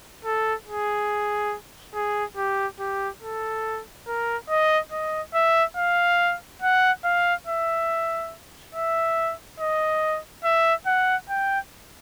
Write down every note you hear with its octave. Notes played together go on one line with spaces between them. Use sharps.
A4
G#4
G#4
G4
G4
A4
A#4
D#5
D#5
E5
F5
F#5
F5
E5
E5
D#5
E5
F#5
G5